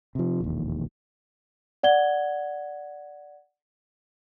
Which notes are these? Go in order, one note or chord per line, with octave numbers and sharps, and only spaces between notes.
C3 F3
E1 A#1 D#2
D5 F#5 G#6 G7